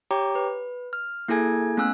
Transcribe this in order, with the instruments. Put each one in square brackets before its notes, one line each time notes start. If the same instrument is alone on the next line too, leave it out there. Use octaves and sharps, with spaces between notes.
[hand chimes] G4 C#5 G5 A#5 D6
B4
F6
A#3 E4 G#4 A4 G#5 G#6
A3 B3 C#4 G#5 E6 F#6